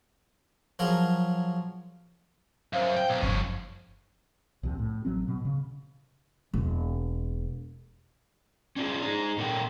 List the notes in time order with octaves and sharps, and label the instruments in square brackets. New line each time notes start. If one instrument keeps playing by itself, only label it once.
[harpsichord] F3 F#3 G#4 A#4
[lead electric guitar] F#2 [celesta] C5 F5
[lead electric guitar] G5
B1
[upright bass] F#1 G2 [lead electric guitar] F3 C#4
[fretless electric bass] C2 F2 C3
A2
A1 F#3 C4
B2
C#3
[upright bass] E1 A#3
[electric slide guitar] C#4 D4 F4 G#4
D#4 G#4
A#2 D4 A4 A#4 F#5 G5